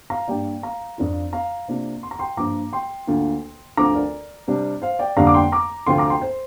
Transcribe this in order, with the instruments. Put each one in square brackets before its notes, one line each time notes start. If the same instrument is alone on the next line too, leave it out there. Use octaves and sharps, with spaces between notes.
[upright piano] F5 A#5
G2 G3 A#3 D5 G5
F5 A#5
F2 F3 D4 F4
F5 A#5
C3 A#3 D4 F4
C6
A#5
G5 C6
G2 F3 A#3 F4 A#5 D6
G5 C6
D2 D3 A#3 F4
D2 D3 F3 C4 F4 A#5 D6
A#4 D5
C3 G3 D4
C5 F5
D5 G5
F2 D3 G3 A#3 D4 F5 A#5
D6
G5 C6
A#5 D6
D2 C3 F3 C4 F4 G5 C6
A#5 D6
G5 C6
C5